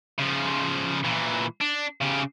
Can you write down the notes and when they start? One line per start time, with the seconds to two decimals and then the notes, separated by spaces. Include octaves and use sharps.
0.18 C#3 F3
1.04 A#2 E3
1.61 D4
2.01 C#3 G4